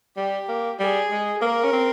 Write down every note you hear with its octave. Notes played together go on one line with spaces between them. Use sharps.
G3 G4
A#3
G3 G#4
G#3
A#3 A#4
C#4
C4